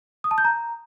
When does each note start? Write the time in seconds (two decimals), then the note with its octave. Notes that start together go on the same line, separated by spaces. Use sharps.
0.24 D#6
0.31 A5
0.38 G6
0.45 A#5